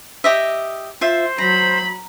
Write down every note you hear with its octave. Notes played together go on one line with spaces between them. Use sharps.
G4 D#5 E5
F4 C5 E5
F#3 A#5 B5